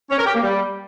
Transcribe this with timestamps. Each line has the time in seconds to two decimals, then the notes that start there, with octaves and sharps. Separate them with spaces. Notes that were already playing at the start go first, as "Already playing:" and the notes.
0.10 C#4
0.18 A#4
0.26 G4
0.34 A#3
0.42 G3